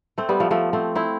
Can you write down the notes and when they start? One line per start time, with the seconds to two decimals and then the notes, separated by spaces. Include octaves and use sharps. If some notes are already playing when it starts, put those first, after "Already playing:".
0.18 A3 C4
0.29 G3 B3
0.40 F3 A3
0.51 F3 A3
0.73 A3 C4
0.95 C4 E4